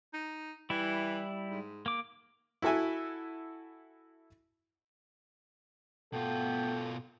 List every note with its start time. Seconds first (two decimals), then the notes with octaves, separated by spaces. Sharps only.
0.13 D#4
0.70 E3 G3 E4
1.51 G#2
1.86 A#3 D6
2.62 E4 F#4 A4 E5 G#5
6.13 B2 A3 B3 F4 A4 G5